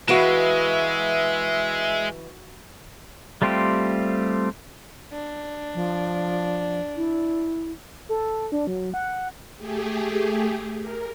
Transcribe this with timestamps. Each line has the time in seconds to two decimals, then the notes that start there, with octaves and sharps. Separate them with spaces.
0.08 E3 G#3 F#4 B4 E5 F5 D7 E7
3.42 G3 A3 C4 F4 G4
5.12 D4
5.74 F3
6.97 E4
8.09 A4
8.52 D4
8.67 F#3
8.94 F#5
9.58 A3 G4 G#4
10.80 A#4